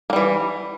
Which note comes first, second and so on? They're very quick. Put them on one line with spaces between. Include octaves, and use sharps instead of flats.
A#3 G3 E3